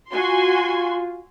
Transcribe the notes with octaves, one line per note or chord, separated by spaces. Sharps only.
F4 F#4 G#5 C6